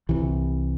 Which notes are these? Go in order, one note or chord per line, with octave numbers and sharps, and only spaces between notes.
C2 C3 E3